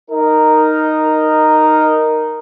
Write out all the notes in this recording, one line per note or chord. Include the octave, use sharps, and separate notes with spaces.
D#4 A#4